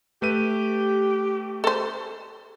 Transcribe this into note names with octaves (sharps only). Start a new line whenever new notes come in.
A3 G4 B4 D#7
A4 C5